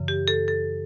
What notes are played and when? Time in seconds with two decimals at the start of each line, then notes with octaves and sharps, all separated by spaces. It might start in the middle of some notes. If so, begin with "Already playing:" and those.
Already playing: F#2 C#3 E3
0.08 G4
0.28 A4
0.48 A4